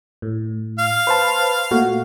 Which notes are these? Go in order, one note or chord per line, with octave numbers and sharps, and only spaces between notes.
A2
F5
B4 C5 A5
A#2 A3 F#4